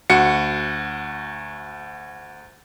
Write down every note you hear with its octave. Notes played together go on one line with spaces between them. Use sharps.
D2 F#4 C#7